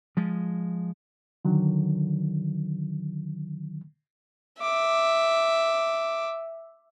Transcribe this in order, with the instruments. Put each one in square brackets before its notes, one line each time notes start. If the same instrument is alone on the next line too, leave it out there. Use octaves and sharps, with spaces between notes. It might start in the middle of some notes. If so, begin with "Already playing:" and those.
[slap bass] F3 G#3
[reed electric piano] D3 D#3 F#3
[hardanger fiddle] E5 [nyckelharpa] D6